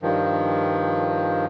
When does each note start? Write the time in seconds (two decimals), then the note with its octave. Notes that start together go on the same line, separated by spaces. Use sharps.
0.02 G2 D#3 F3